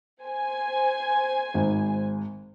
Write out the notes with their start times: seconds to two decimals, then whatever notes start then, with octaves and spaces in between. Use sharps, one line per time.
0.22 C5 G#5
1.54 G#1